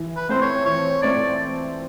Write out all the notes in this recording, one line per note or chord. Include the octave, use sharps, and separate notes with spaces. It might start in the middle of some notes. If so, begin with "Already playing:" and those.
Already playing: E3
B4
A3 C4 C5
C#5
E3 C#5
A3 C4 D5